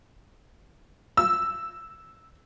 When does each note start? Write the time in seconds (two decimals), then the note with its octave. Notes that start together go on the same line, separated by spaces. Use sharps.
1.17 E6